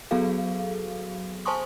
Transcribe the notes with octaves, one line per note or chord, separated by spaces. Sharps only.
F#3 B3 F#4 G#4 A4 F5
C5 G#5 A5 C6 C#6 D#6